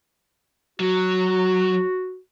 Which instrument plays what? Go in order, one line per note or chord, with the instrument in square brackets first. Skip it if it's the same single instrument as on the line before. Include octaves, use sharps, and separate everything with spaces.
[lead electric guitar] F#3 [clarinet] F#4